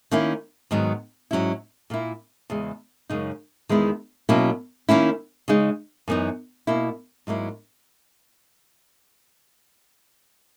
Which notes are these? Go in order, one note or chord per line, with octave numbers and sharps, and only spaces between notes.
D#3 A#3 C#4 E4
G#2 D#3 F#3 B3
G#2 F#3 C#4 E4
A#2 A#3 E4
E2 C#3 G#3
F#2 C#3 G#3 D#4
E2 D#3 G#3 B3 E4
B2 F#3 A#3 C#4 E4
D#3 A#3 C#4 E4
C#3 G#3 D#4
F#2 E3 B3 D#4
B2 A#3 E4
G#2 F#3 A#3 E4